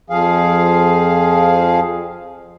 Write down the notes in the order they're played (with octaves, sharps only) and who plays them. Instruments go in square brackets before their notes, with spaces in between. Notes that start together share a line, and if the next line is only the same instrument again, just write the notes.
[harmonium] F2 F3 G#4 F5